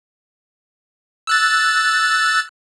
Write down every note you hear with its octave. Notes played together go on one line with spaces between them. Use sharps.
E6 F#6 A6